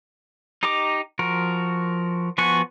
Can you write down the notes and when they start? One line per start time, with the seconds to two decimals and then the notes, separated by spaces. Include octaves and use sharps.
0.63 D#4 G4 D#5 A#5 D6
1.19 F3 F#4 A#4
2.38 F3 B3 F#4 G#5 C#6